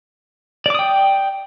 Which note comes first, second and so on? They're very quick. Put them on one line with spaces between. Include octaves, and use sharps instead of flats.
D5 D6 D#6 G5